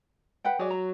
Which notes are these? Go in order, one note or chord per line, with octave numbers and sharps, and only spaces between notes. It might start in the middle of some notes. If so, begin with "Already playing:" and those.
B4 F#5 G5
F#3 G#4 D5
A#5